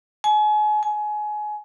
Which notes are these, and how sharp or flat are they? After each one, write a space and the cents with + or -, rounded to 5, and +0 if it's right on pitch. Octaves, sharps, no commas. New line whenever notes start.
G#5 +35
G#5 +25